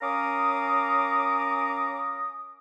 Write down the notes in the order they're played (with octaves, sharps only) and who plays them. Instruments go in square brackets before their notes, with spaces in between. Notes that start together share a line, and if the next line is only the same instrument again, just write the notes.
[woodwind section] C#4 A#4 F5 A#5 D6 D#6